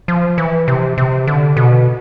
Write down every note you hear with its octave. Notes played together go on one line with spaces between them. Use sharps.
F3
E3
C3
C3
D3
B2